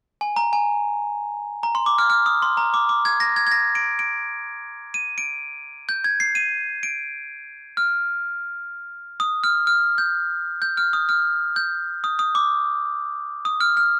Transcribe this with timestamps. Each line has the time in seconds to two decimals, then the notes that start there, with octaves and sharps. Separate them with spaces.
0.21 G#5
0.36 A#5
0.53 G#5
1.63 A#5
1.75 C6
1.86 D6
1.98 F6
2.10 F6
2.26 D#6
2.42 C6
2.57 A#5
2.74 D6
2.89 D6
3.05 G#6
3.20 A#6
3.36 G#6
3.47 G#6
3.51 A#6
3.75 D7
3.99 D7
4.94 D#7
5.18 D7
5.89 G6
6.04 G#6
6.20 C7
6.35 D#7
6.83 D7
7.77 F6
9.20 D#6
9.44 F6
9.67 F6
9.98 G6
10.62 G6
10.77 F6
10.93 D#6
11.09 F6
11.56 G6
12.04 D#6
12.19 D#6
12.35 D6
13.45 D#6
13.60 F6
13.77 F6